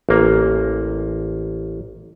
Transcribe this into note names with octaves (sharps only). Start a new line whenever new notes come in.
A1 A#3